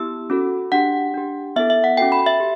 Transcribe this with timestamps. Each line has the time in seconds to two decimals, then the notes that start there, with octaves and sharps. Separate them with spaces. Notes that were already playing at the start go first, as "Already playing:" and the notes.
Already playing: B3 E4 G4 E6
0.30 C#4 F#4 A4
0.72 D4 G4 F#5
1.14 D4 G4
1.56 B3 E4 A4 E5
1.70 E5
1.84 F#5
1.97 C#4 F#4 A4 G5
2.12 B5
2.27 E5
2.40 G4